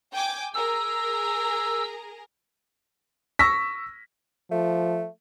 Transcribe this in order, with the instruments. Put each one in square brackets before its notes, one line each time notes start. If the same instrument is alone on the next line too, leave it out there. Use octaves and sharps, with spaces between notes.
[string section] G5 G#5 D6
[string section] G#4 A#4 [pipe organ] E6
[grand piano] C#6 E6 A#6 B6
[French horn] F3 [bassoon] A3